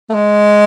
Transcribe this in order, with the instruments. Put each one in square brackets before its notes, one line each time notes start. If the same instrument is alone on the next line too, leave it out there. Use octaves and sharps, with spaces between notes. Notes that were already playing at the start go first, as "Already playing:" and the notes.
[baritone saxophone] A3
G#3